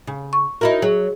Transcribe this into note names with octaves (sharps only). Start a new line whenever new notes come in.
C#3
C#6
D#4 E4 F#4 A#4 E5
F#3 G#4